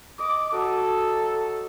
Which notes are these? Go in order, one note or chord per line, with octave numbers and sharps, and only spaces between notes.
D#5 D6
F#3 F#4 A4